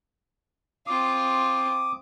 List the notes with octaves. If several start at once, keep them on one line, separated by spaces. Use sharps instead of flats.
C4 F4 D6 D#6